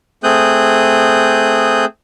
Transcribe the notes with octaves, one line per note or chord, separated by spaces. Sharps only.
A3 C4 G#4 D#6 F#6 G6